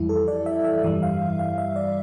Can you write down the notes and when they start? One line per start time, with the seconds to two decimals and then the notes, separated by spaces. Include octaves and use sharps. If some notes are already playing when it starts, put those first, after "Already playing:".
Already playing: F2 E3 G3 E4
0.09 A4
0.28 D5
0.46 E5
0.64 E5
0.83 G2 E3 G3 E5
1.03 F5
1.39 F5
1.58 E5
1.76 D5